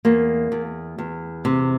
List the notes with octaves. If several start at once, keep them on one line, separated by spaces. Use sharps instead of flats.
E2 A#3
E2
E2
C3